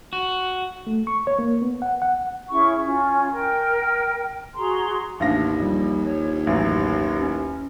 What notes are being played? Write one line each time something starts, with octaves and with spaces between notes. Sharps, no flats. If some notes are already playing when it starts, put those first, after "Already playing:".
F#4
A3
C#6
C#5
A#3
B3
F#5
F#5
C#4 E4 G#4 C#6
C#4 F4
A#4 G5
F#4 G#4 A#5 C6
A1 D#2 D4 F5 A#6
A#1 G3
C#5
A1 F#2 A#6
C#4